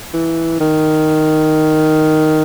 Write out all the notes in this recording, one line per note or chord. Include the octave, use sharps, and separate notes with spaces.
E3
D#3